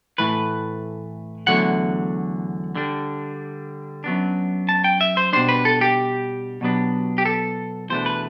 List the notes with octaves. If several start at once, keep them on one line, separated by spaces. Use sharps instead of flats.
A2 E3 A3 B4
E2 D3 F#3 A3 F#5
D3 G3 D4
F#2 F#3 B3 D4
A5
G5
E5
C5
B2 G3 D4 C5
B4
A4
G4
B2 F#3 B3 D4
G4
A4
E2 B2 A3 D4 C5
B4